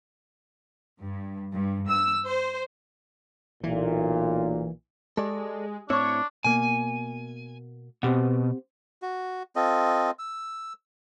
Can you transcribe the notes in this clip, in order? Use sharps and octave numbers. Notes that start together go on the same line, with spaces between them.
G2
G2
E6
C5
B1 A#2 E3
G#3 G4 A4 D5
A2 C4 D4 E4 C#5 C#6 E6
B2 A#3 G#5
B2 C4 G4 F#5
F#4
C4 F4 A4 D#5
E6